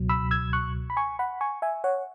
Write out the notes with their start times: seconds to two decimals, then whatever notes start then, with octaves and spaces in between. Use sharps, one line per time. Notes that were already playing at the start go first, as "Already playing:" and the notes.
Already playing: C#2 B2 F#3
0.09 B5 E6
0.31 E6 G#6
0.53 C#6 F#6
0.90 B5
0.97 G#5 C#6
1.19 F#5 B5
1.41 G#5 C#6
1.62 E5 G#5
1.84 C#5 F#5